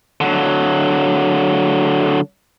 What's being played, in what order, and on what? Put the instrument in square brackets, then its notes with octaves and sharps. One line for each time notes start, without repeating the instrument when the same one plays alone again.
[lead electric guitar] D3 F#3